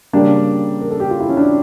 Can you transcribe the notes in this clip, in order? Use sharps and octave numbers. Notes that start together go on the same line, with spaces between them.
C#3 G3 A#3 D4
A#4
A4
G4
F4
E4
C#4
D4